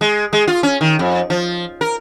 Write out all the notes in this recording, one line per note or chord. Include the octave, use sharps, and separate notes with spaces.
G#3
G#3
F4
C#4
D#3
F2
F3
A#4